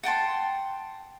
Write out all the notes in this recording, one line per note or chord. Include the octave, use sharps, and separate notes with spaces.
F#5 G5 A5 C6